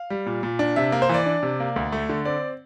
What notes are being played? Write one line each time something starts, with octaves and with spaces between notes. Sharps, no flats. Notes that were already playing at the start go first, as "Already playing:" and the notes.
Already playing: F5
G3
A#2
A#2
D4
C3 E5
A#3
C5
E3 D5
D4
C3
A#3
D2
A3
D3
C4 D5